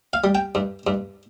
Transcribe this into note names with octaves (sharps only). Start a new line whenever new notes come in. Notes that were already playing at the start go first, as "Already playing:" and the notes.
F5
G3
G5
G2
G2